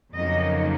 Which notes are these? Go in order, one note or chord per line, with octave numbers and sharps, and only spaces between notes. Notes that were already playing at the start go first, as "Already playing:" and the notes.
F2 C#3 F#3 A#3 D#4 D#5